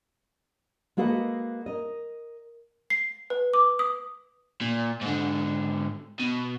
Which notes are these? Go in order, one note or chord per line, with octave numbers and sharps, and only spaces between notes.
G#3 A#3 F#4 A4 B4 D#5
A#4 D#5
C7
B4
D6
D#6
A#2
G#2 D3
B2